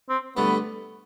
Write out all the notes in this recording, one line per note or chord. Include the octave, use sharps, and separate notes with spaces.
C4
G2 D3 A3 B3